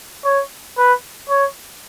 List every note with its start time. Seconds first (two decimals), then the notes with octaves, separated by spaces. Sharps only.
0.25 C#5
0.77 B4
1.29 C#5